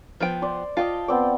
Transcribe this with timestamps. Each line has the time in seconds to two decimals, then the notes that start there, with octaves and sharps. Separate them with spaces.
0.20 F3 B3 G5
0.42 C5 D5 C6
0.77 F4 D#5 G5 A5
1.08 B3 C4 D5